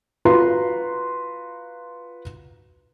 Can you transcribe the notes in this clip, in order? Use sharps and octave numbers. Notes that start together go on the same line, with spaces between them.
F4 F#4 B4 A#5 C6